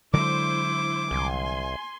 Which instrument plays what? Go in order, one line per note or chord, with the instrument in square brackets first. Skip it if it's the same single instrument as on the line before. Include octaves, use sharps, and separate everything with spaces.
[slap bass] D3 F#3 G#3 [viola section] E4 C5 [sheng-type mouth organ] D6
[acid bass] C2 [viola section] G#5 C6